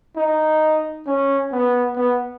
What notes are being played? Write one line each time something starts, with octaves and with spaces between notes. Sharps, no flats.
D#4
C#4
B3
B3